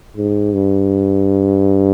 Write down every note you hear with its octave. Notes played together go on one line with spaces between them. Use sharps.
G#2
G2